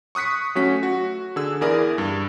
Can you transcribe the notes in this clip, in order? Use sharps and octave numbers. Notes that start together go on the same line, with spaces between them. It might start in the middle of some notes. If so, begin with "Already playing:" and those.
C#6 D#6 F#6 B6 C#7
F#3 A3 C#4 F#4 B6
F#4
D3 G#4 E6
E2 E4 G#4 A#4 D5 D#6
G2